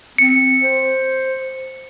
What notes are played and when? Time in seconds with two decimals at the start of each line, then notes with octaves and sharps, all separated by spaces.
0.18 C4 C#7
0.63 C5